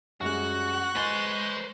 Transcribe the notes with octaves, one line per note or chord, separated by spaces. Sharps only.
F#2 G3 G#3 F#4 C#6 F#6
G#3 B4 C5 D#5 G#5 C6 A6